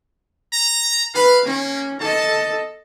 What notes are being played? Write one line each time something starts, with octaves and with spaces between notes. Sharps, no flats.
A#5
B4 F5
A#3 C#4
A4 D#5 A5